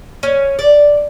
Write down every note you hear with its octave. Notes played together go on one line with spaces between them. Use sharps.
C#4
D5